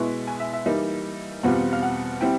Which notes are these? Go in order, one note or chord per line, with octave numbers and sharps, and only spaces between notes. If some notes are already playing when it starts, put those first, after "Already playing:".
Already playing: B2 G#3 B3 E4 C#6
G#5
E5
E5
E3 G3 A#3 D#4 E5
E2 B2 G3 C4 F4 F#5
F5
F#5
G3 C4 E4 G5